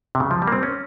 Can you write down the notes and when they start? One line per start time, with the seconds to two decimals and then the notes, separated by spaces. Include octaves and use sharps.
0.15 C3
0.20 C#3
0.31 F3
0.42 G3
0.48 A#3
0.52 C4
0.63 C#4